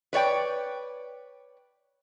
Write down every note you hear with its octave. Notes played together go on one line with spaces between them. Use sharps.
B4 C#5 D5 G5